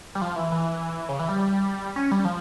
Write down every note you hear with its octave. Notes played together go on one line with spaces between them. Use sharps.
G3
F3
E3
E3
C#3
E3
G3
C#4
G3
F3